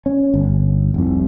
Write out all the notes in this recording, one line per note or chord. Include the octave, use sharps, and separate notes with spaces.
C#4
G1
F1 C2